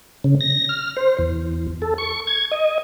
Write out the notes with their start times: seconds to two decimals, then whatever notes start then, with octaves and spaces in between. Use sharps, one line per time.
0.24 C#3
0.41 A#6
0.69 F6
0.97 C5
1.19 E2
1.82 A4
1.98 C#6
2.27 G#6
2.52 D#5